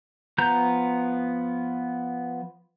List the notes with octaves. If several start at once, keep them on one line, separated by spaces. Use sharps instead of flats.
F3 B3 A#5 G6